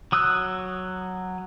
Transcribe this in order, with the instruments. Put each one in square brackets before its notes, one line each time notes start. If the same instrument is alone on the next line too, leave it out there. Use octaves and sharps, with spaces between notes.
[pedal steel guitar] F#3 D#6 E6 F#6